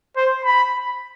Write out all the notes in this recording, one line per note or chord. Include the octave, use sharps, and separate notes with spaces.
C5
B5